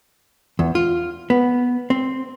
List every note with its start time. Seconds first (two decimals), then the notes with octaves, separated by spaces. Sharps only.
0.59 E2
0.75 F4
1.30 B3
1.90 C4